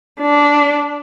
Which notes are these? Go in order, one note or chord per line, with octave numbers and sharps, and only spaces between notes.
D4